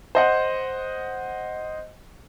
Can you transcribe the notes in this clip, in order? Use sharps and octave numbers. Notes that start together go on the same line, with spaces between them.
C5 D#5 F#5